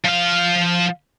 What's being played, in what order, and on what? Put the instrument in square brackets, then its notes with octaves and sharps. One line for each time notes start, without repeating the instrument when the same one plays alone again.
[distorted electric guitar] F3 F5